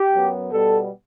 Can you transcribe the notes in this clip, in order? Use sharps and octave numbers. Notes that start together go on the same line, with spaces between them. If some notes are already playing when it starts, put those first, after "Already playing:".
Already playing: G4
F#2 F#3 B3
B2 G3 B3 A4